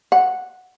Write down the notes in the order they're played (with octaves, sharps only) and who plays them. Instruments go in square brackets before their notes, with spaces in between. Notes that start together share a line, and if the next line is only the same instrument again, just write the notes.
[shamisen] F#5